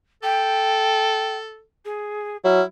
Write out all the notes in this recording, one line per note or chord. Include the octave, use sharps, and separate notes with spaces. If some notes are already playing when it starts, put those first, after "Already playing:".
A4 G5
G#4
F#3 E4 F6